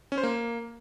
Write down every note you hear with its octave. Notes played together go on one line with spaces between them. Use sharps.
C#4
C5
A#3